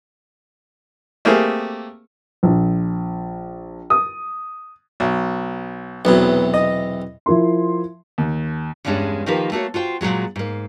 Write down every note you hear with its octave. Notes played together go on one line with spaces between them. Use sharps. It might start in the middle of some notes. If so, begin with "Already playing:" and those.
A3 A#3 C4 G4 G#4
A#1
D#6
B1
B1 E2 C3 F#3 B3
D#5
F3 E4 A#4 C6
D#2
E2 G2 G3 G#3 C#4 D4
D#3 F3 A#3 G4 A#4 B4
A3 A#3 F#4 C#5
F4 F#4 C5 G5
A#2 D3 F#3 G#3
G#2 A#3